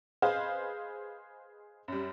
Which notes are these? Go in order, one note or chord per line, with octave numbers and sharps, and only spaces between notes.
G#4 B4 C5 D#5 F5
F#2 G3